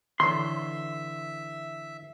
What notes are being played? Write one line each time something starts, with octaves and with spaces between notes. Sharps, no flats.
D3 E3 C#5 E5 C6